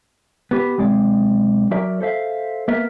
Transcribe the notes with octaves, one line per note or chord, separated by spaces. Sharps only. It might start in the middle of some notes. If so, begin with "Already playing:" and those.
B3 G4 B4
B1 G#3 C4 D5
F#3 F#4 A#4 D5 E5
A4 C5 E5 F5
A#3 B3 A#4 E5